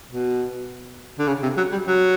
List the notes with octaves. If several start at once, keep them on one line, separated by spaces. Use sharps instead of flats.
B2
D3
C#3
C3
F#3
G3
F#3